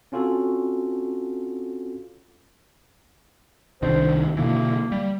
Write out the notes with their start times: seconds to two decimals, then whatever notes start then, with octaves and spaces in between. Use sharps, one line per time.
0.12 C4 C#4 F4 F#4 A4
3.82 C2 D#3 D4 C5
4.37 B2 D3 E3 A#3
4.92 G3